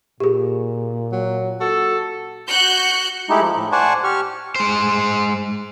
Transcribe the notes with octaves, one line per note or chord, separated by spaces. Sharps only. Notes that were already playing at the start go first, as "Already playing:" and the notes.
A#2 G4 G#4
F#3
F#4 A4
F#4 F#6 G6 C#7
G#3 A3 D#4 E4 G4
F3
A2
C5 D5 F#5 G#5 A5 C#6
G4 C#6 F6
G#3 C5